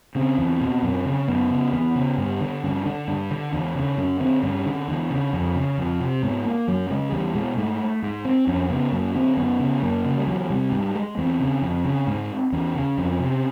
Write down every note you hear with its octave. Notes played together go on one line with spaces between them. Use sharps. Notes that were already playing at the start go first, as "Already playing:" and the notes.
C#3 C4
E2
B2
F#2
C#3
F#2 B3
C#3
E2 B3
C#3
G2
D3
G2 C#4
D3 D4
G2 D4
D3
E2 D4
C#3
F#2 C#4
D3 C4
G2 C#4
D3
E2 D4
C#3
F2
C#3
F2
C3
G#2 B3
A#3
F#2 F#3
C#3 G#3
E2 G3
B2 G#3
G#2 A3
G#2
C4
F2 C#4
C#3 B3
F#2 A#3
D3 C4
F#2 B3
C#3
F#2 A#3
C#3
G3
E2 F#3
C3 G3
G#2 G3
G#3
E2 C4
C#3
F2
C#3
G#2
E2 C#4
C#3
F2
C3